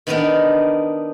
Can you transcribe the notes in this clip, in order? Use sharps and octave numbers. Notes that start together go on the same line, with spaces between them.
D#3 B3 D4 D#4 A#4